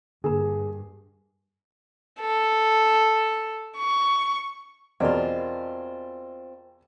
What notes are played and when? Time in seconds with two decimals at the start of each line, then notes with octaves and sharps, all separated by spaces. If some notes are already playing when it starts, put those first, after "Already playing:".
0.24 G2 D3 A#3 G#4 A#4
2.20 A4
3.78 C#6
5.00 E2 B2 C4 F4 A#4 D5 D#5